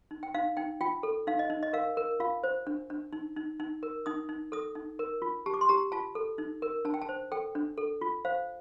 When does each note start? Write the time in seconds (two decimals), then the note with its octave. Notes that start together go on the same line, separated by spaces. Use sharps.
0.11 D#4
0.23 G5
0.34 D#4 F5
0.57 D#4 G5
0.81 F4 G5
1.03 A4
1.27 D#4 F5
1.39 D#5
1.50 D#4
1.63 D#5
1.73 A#4 F5
1.97 A#4
2.20 F4 F5
2.43 C5
2.67 D4
2.90 D4
3.13 D#4
3.36 D#4
3.60 D#4
3.83 A#4
4.06 D#4 D#6
4.29 D#4
4.52 A4 D#6
4.75 D#4
4.99 A#4
5.22 F4
5.46 G4 A5
5.54 D6
5.61 C6
5.69 G4 A#5
5.92 F4 A5
6.15 A4
6.38 D#4
6.62 A#4
6.85 D4 A5
6.94 G5
7.02 A5
7.09 C5
7.32 A4 G5
7.55 D4
7.77 A4
8.01 F4
8.25 C5 F5